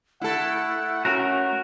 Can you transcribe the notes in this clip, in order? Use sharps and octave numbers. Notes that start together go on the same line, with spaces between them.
A3 E4 A4 F#5
C#4 F#4 A#4